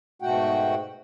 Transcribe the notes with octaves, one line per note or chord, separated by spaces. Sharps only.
G#2 B2 A3 F#4 F#5 G5